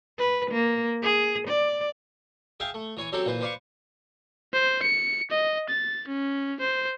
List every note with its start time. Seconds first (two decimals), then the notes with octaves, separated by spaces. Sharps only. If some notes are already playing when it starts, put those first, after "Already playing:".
0.19 B4
0.51 A#3
1.02 G#4
1.48 D5
2.60 G#4 E5 F5 G5 A5
2.74 A3
2.97 E3 C#5 G#5
3.12 F#3 C4 C#4 G4 A4
3.25 A#2 E3 B4 C5
3.41 B4 C5 D5 F5 B5 C#6
4.53 C5
4.82 C#7
5.31 D#5
5.69 A6
6.07 C#4
6.60 C5